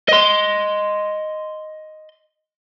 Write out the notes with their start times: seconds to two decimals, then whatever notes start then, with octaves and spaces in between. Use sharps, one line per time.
0.09 D#5 C6